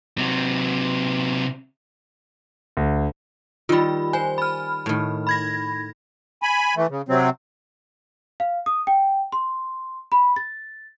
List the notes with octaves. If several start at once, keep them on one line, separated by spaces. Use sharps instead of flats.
C3 F#3
D2
D#3 G3 F4 B5
C5 G#5
B5 F6
A2 D#3
B5 G#6 A#6
G#5 B5
E3 A3
C#3
C3 F#3 C4
F5
D#6
G5
C6
B5
A6